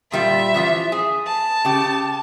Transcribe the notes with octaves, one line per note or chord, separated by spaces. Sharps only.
A#2 G3 F4 E5
E3 F3 F4
G#4
A5
C#3 G4